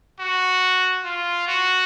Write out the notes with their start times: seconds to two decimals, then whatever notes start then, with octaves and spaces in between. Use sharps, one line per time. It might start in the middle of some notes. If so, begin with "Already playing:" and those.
0.20 F#4
1.04 F4
1.47 F#4